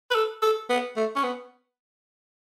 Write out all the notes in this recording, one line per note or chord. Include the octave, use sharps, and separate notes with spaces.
B4
A4
A4
B3
A3
C#4
B3